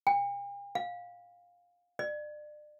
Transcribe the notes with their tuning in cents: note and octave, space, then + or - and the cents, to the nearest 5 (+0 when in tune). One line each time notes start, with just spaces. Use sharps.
G5 +45
F5 +20
D5 +35